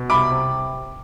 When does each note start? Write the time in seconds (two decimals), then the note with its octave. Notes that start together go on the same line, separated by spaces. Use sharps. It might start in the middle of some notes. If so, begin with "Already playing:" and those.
Already playing: B2
0.10 C2 B5 D6
0.31 C3